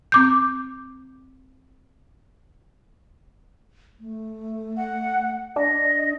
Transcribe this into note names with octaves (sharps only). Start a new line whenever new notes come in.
C4 D6 G6
A3
F#5
D4 D#5